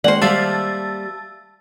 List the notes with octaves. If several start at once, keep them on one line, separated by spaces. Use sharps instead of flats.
D#3 G#3 A#3 C5 D5 F#5 F#7
G3 A#3 E5 F5 A5 E6 A6